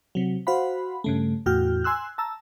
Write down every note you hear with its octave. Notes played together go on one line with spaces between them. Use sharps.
C3 F#3
F#4 C5 F5 F#5 B5
G2 C#3 A3
E2 A2 F#4 G5 F6 G6
G#5 C6 E6 F#6
A5 A#5 E6